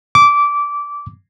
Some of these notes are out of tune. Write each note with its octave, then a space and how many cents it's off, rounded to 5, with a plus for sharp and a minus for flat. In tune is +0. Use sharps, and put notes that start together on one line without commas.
D6 -15